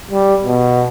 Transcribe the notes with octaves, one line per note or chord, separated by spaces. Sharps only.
G3
B2